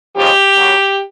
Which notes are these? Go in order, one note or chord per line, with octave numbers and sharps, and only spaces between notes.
D#2 C#3 F3 G#3 G4
F#2 C#3 F#3